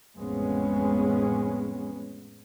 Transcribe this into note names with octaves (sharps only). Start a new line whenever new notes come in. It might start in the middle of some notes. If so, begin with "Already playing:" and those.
A1 F2 G#3 B3 C#4